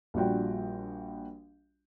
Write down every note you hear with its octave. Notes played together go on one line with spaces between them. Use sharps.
A#1 G3 D4 F4 F#4 G5